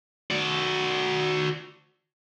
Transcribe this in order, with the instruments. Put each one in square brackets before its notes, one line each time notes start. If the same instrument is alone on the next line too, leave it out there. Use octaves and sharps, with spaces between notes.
[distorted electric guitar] F#4 D5